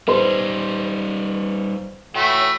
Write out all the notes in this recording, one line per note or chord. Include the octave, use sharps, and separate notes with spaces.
G3 D#4 B4 C5 C6
E3 A3 F#4 C#5 G5